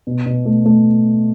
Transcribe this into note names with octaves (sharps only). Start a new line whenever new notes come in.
B2
B2
A3
A3